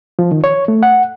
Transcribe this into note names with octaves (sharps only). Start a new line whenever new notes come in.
F3
D#3
C#5
A3
F#5